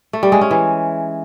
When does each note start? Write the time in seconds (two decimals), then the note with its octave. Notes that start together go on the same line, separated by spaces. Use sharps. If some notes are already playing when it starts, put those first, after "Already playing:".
0.13 A3
0.23 G3
0.32 G#3
0.41 C#4
0.51 E3